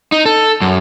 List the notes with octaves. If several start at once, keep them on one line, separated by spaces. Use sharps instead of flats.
D#4
A4
F#2